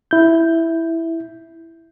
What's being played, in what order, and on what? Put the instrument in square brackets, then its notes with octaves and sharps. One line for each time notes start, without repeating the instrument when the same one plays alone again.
[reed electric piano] E4 G6